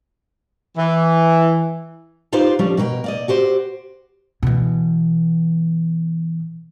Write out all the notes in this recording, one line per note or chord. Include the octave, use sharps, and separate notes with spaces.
E3
D#4 F4 G4 B4 C5 F5
D3 F3 G3 C#4
B2 A#4 C#5 G5
A#3 D5 D#5
F#4 G4 C5
B2 E3